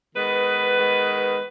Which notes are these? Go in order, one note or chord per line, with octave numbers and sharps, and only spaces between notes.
D#3 G#3 B3 B4
D#3 G#3 B3